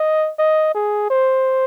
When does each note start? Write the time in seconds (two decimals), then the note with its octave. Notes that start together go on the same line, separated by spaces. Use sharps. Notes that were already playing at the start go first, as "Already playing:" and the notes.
Already playing: D#5
0.39 D#5
0.74 G#4
1.10 C5